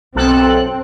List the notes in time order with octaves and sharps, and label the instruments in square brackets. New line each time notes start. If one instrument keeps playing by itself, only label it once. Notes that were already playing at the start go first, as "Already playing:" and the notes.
[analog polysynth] B1 A4 F#6 [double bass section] C4